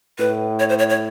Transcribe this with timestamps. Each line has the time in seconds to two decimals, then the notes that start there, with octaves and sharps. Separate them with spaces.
0.19 A2 B4
0.59 C#5
0.69 C5
0.79 C#5
0.89 C#5